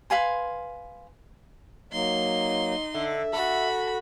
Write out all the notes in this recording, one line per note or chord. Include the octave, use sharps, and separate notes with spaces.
B4 F5 G#5 C6
F#3 A#3 D#4 C6
D3 E5
F#4 A4 B5